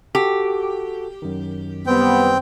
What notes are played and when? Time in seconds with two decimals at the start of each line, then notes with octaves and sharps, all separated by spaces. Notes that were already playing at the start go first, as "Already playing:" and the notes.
0.15 F#4 G4 A4
1.22 F#2 D#3
1.87 G3 B3 C4 G5